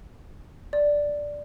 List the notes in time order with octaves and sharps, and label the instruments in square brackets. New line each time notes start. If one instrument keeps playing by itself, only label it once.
[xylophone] D5